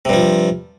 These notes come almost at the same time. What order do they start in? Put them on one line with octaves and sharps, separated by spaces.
C3 G2 F3